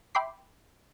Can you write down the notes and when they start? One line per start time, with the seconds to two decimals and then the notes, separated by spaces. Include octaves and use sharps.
0.15 E5 G5 B5 C6 D6 C7